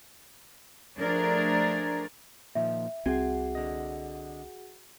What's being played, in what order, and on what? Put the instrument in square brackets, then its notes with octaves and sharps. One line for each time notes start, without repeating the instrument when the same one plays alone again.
[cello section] F3 A3 D4 G#4 A#4 D5
[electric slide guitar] A#2 D#3 F3 [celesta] E5
[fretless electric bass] C2 C4 [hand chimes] F#4 G#4 F#5 [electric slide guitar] G#5
[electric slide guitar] D3 D#5